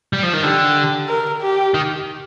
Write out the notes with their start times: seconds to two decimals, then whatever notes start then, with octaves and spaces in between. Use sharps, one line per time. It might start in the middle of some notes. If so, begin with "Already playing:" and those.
0.13 G3
0.23 F3
0.34 D#3
0.43 D3 G4
1.09 A#4
1.42 G4
1.74 D#3